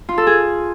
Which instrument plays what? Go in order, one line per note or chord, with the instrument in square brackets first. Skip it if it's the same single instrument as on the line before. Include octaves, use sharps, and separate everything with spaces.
[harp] F4
A4
G#4